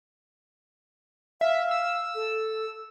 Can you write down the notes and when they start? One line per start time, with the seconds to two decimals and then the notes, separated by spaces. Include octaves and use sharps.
1.41 E5 F5
1.71 E6
2.15 A4